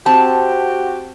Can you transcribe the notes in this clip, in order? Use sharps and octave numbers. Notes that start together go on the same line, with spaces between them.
C4 F#4 G4 A5